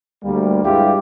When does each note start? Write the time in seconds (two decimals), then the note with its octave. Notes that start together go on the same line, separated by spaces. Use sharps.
0.24 D2 G3 A#3
0.65 G2 G3 G#3 E4 F4 G4